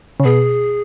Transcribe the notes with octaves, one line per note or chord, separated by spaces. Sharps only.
C#3
B2 G#4